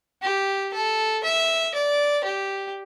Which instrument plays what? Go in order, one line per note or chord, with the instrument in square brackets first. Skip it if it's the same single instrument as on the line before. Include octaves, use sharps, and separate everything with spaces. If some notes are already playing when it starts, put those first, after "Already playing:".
[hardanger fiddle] G4
A4
E5
D5
G4